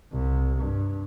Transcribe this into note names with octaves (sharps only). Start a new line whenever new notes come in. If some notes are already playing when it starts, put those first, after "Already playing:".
C2
G2